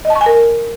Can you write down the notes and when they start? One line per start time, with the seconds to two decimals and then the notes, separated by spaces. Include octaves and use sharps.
0.05 D#5
0.10 A5
0.16 C#6
0.21 G#5
0.26 A#4